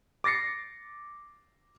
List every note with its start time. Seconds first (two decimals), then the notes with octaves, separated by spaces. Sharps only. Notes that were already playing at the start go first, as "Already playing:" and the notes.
0.24 D6 A6 A#6 C7 C#7